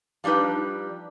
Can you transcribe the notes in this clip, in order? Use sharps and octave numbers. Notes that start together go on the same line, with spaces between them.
F3 G3 D4 D#4 B4